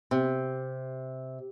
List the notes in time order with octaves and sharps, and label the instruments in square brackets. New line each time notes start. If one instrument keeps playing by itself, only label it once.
[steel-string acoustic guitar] C3